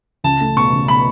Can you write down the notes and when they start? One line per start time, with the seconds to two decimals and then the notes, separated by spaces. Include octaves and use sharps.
0.24 C#2 A5
0.41 A3
0.56 B2 C#6
0.72 C#2
0.88 B2 B5